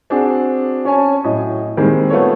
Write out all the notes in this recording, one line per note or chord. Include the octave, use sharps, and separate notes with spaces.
C4 D4 F#4 G#4
C#4 C#5 G#5 A5
A2 F#3 D#5
D#3 G3 G#3 A#3 C4
A3 B3 F4 A4 C#5